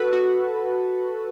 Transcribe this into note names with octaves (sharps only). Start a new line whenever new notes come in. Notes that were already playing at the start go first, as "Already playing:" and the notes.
Already playing: F#4 A4 B4
F#4